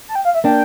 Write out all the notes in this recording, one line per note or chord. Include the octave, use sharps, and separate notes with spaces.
A5
G5
F5
E5
A#3 D4 G5